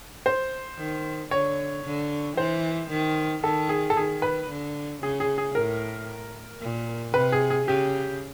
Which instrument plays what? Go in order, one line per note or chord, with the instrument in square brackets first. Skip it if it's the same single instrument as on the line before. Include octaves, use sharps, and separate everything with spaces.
[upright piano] C5
[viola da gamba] D#3
[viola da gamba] D3 [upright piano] C#5
[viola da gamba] D3
[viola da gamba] E3 [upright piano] C5
[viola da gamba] D#3
[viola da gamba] D#3 [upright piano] A4
[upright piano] G#4
A4
[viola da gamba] D#3 [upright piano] G#4
[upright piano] B4
[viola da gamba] D3
[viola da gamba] C#3 [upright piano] G#4
[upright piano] G#4
G#4
[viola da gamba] A2 [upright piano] A#4
[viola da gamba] A#2
[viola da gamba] C3 [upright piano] B4
[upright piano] G#4
G#4
[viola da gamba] C#3 [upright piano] G4